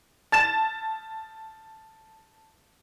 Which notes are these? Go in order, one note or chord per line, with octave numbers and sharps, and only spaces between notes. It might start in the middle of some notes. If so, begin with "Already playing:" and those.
A5 A6 E7